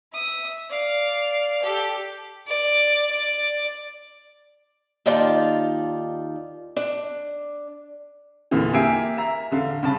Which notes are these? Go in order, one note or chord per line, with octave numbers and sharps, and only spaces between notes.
E5 D#6
D5 F5
G4 A4
D5
D5
D#2 D#4 F4 D5 G5 A5
D4
E2 A#2 D3 E3
A#3 G4 E5 G#5 C7 D7
E5 A#5
A1 D3 F5
G2 C#3 A5 B5